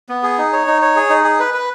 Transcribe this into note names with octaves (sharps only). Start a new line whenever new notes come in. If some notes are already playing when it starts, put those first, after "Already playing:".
B3
G#4
D#4
C#5
D#4
C#5
G#4
D#4
G#4
B4
B4